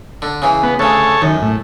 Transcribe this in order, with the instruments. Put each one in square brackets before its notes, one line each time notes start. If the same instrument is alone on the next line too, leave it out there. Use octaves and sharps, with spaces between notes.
[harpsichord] D3
C#3 E3
[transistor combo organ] B3
[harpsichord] D2 C#3 [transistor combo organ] A4 C#5
[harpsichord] F#2 [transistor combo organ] D#3
[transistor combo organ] A2